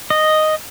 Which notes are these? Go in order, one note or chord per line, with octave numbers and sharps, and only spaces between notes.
D#5